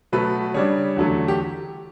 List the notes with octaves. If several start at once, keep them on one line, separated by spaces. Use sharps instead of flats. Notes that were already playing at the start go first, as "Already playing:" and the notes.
B2 F#3 A3 B4
C#3 G3 D4 C#5
E2 D3 F#3 A3
G4